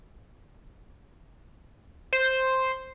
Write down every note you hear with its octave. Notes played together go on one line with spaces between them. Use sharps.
C5